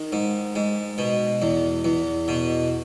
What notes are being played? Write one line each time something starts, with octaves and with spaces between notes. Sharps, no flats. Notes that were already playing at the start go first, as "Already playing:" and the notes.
Already playing: D#3
G#2
G#2
B2
E2
E2
B2